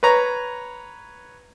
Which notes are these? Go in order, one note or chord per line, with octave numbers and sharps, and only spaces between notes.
B4 C#5 A#5